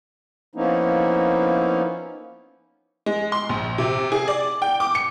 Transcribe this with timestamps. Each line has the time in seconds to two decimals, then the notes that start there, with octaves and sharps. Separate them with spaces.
0.55 F3 A#3 B3 C#4 D#4 E4
3.06 G#3
3.32 C6
3.49 A#1
3.78 C3
4.12 G#4
4.28 D5
4.62 G5
4.80 D6
4.95 C#7